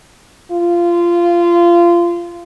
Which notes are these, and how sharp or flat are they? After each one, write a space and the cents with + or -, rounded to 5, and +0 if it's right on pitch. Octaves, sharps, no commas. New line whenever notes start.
F4 -20